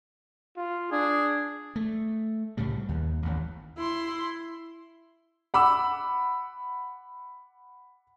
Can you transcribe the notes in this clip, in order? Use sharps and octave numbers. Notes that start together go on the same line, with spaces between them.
F4
D4 G#4
A3
C2 A2 C#3 G3
D#2
A1 D#2
E4 C6
F#5 B5 D6 E6